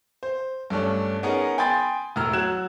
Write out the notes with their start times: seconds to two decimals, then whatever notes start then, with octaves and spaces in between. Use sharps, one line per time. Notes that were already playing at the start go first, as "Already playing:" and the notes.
0.23 C5
0.70 G2 A3 C#4 D4
1.23 B3 C#4 D#4 G#4 A#4
1.58 G5 G#5 B5 C6 D#6 A6
2.16 E1 A2 A#5 E6 F6
2.33 F#3 F#6 G#6 E7